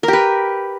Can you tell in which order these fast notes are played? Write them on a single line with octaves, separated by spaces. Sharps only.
A#4 G4 B4